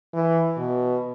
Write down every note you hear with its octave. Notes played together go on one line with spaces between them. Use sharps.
E3
B2